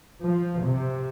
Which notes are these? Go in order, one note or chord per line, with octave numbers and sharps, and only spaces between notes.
F3
C3